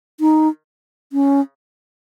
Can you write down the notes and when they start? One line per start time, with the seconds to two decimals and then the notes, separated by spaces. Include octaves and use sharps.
0.20 D#4
1.13 C#4